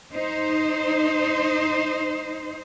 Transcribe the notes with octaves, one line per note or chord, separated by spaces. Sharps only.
D#4 C5